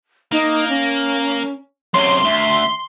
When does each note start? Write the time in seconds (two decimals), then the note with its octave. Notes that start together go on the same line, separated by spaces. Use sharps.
0.32 A#3 D#4
0.69 C#4
1.94 F#2 C3 C#5 C6
2.25 D2 E5